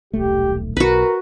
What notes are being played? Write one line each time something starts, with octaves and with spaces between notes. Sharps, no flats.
D#1 B1 A3 G4
B1 F#4 A#4 B4